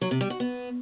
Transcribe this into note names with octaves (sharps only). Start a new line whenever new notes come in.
F#3
C3
G3
F#4
B3